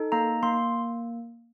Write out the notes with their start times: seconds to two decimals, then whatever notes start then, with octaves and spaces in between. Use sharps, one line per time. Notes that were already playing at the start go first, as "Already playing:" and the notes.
Already playing: D#4 A4
0.12 A#3 A#5
0.43 A#3 C6